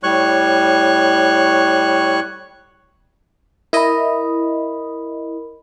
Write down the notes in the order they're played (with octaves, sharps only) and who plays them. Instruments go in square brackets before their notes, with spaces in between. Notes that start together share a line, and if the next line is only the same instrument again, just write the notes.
[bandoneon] A2 G3 C#5 C#6 F#6
[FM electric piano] E4 D#5 [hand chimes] A#4 B5